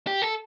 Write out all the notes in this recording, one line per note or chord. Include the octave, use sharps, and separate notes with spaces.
G4
A4